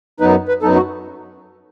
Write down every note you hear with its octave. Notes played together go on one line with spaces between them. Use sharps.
F#2 F#3 B3 D#4 B4
B4
F#2 F#3 B3 D#4 A4
F#4